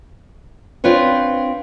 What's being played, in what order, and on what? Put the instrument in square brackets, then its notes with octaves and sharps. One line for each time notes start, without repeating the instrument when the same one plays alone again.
[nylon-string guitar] C4 D4 F4 B4 C#5